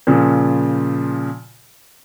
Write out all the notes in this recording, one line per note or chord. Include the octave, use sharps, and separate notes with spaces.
A#2 C#3 F3